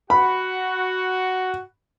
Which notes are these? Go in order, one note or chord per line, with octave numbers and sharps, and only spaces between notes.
F#4 F#5 B5